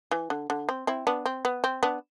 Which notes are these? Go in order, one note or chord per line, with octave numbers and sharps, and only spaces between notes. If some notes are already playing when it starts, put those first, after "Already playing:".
E3
D3
D3
C4
C4 E4
B3 D4
C4
B3
C4
B3 D4